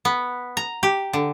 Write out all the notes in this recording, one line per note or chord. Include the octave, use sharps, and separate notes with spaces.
B3
A#5
G4
D3